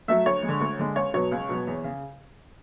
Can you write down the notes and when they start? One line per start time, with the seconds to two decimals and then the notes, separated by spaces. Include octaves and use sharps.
0.08 F#3 A3 E5
0.26 D2 C#5
0.43 G#3
0.49 D3
0.61 D2
0.79 D3 G#3
0.96 C#2 C#5
1.14 B2 F#3 B3 C#5
1.32 C#2
1.49 B2 F#3 B3
1.67 E2
1.84 C#3